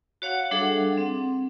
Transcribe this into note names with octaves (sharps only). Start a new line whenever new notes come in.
F#4 C#5 F5 F#5
G3 D4 G#4 A4 E5 F#5
C4